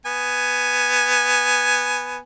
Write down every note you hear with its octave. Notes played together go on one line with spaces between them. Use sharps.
B3 G#5